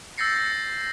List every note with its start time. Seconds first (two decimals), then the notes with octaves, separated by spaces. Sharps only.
0.18 E6 G6 A6 A#6 C7 C#7